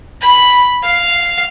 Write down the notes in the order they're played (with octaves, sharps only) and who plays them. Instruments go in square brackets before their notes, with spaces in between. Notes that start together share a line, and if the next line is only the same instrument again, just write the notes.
[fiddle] B5
F5